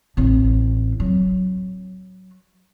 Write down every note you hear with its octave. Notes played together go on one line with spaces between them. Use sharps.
A1 C4
F#3